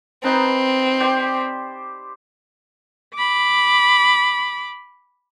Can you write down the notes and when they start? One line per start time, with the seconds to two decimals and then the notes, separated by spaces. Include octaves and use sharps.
0.24 C4 D#4 B4 A5
1.00 G4 C5 D5
3.15 B5 D6